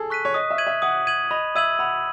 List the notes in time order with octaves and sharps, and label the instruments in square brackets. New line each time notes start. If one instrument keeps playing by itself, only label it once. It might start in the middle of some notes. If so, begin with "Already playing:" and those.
Already playing: [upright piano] G#4 A4
[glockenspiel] C#6 F#6 B6 D#7
[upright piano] C#5
[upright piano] D#5 [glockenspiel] D#6
[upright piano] E5
[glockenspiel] G#6 D#7 F#7
[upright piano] E5
[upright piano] F#5 [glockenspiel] D#6
[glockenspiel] G#6 D#7 F#7
[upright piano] D#5 [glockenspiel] B5
[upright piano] E5 [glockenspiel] E6 G#6 D#7 F#7
[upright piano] F#5 [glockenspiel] B5